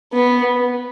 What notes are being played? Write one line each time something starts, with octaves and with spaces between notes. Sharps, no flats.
B3